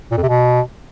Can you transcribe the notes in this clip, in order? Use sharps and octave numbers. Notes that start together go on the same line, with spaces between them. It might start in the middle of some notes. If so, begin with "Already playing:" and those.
A#2
F2
C3
B2